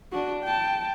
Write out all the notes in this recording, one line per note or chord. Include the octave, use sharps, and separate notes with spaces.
D4 F#4
G5 A5